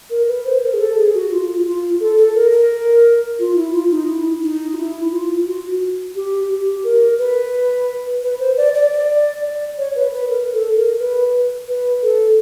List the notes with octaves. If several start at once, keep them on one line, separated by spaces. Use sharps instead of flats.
A#4
B4
C5
A#4
G#4
A4
G#4
F#4
F4
F4
A4
A4
A#4
A#4
F4
E4
F4
D#4
E4
D#4
F4
E4
F4
F#4
G4
G4
A#4
B4
B4
C5
D5
D5
D5
C#5
B4
B4
A#4
A4
A#4
B4
B4
A4